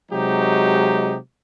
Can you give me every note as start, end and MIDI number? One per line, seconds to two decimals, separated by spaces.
0.11 1.17 48
0.11 1.17 54
0.11 1.17 56
0.11 1.17 63
0.11 1.17 67